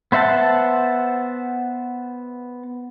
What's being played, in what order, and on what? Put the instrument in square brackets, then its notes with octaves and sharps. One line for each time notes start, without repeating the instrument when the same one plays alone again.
[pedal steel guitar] B3 C5 E5 F#5 A5